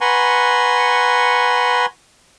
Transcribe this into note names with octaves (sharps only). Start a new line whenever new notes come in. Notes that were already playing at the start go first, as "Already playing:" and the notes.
B4 F#5 G#5 A#5 C6 C#6